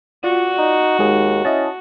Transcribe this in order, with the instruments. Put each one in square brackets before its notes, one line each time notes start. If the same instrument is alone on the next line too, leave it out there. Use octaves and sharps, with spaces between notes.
[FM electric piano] F4 D5 [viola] F#4
[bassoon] D#4
[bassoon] D#2 [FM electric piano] G#3 D#4 G#4
[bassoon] C#4 [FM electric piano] E4 D#5 A5